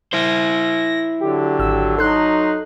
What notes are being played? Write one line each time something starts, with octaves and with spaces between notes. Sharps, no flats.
E4 C5 A#6
D3 F#3 G4
G#1 E6
F#3 D#4 A4 C6 F#6